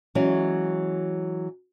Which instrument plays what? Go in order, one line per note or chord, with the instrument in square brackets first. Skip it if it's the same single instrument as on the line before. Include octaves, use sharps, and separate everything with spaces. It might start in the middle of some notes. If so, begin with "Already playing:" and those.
[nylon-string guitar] E3 F#3 G#3 C#4